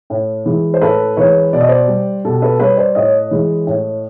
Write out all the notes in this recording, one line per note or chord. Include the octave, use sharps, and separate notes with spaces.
A2
E3 G#3
C5
A2 A4 B4
E3 G#3 B4 C#5
B2 D5
D#5
C5 D5
G3
B2 G4 A4
A4 B4
G3 B4 C#5
C5 D5
A2 C#5 D#5
E3 G#3
A2